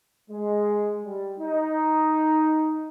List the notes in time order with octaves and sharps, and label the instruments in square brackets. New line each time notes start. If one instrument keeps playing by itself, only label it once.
[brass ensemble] G#3
G3
D#4